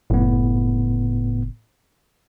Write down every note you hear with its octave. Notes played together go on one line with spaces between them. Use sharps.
F#1 A2 B3